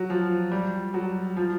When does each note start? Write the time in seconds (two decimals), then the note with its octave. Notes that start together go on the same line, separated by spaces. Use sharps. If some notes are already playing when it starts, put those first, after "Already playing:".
Already playing: F#3
0.10 F3
0.51 G3
0.94 F#3
1.37 F3